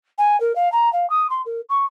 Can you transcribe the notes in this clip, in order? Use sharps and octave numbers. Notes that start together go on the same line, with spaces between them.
G#5
A#4
F5
A#5
F5
D#6
C6
A#4
C#6